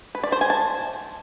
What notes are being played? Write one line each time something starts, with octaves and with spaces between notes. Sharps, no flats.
B4
D5
C5
G#5
A5